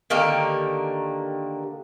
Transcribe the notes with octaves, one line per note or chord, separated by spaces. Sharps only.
D3 D#3 A#3 G4